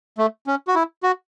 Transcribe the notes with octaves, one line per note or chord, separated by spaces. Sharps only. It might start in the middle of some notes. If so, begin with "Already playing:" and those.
A3
C#4
F#4
E4
F#4